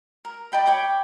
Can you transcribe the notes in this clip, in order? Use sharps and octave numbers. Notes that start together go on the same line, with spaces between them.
A#4
D5 D#5 G5 B5
C#5 G5 B5 D6